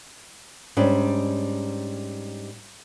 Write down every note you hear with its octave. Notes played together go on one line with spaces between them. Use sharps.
G#2 G3 C#4 D4